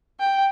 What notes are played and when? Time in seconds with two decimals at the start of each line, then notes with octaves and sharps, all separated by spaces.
0.20 G5